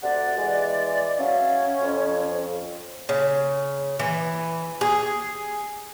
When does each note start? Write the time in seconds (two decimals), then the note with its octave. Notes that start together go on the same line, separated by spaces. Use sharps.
0.03 D2 C3 D5 F#5
0.37 E3 G#3
1.18 F#3 C#4 E5 F5
1.81 F2
3.09 C#3
3.99 E3
4.81 G#4